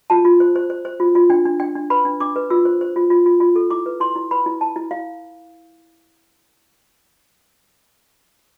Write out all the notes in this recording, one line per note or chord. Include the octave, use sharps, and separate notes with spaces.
F4 A5
F4
C5
C5
C5
C5
F4
F4
D4 G5
D4
D4 G5
D4
B4 B5
D4
D4 D6
B4
F4 E6
C5
C5
F4
F4
F4
F4
A4
E4 D6
B4
E4 C6
E4
B4 B5
E4
E4 A5
E4
E4 F5